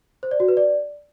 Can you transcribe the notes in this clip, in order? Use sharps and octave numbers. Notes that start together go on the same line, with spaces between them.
C5
D5
F#4
B4
D5